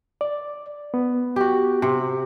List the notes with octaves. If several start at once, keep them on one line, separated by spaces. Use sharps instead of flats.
D5
B3
F#4 G4
C3